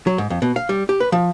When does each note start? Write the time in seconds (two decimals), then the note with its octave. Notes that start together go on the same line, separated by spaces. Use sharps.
0.07 F#3
0.18 G#2
0.30 F2
0.42 B2
0.56 F5
0.69 G3
0.89 G4
1.00 B4
1.12 F3